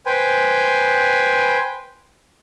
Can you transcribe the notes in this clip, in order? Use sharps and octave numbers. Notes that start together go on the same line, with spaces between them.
B4 C5 G5 G#5